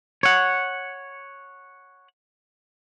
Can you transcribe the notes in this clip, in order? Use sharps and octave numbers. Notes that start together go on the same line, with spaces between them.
C#5 F#5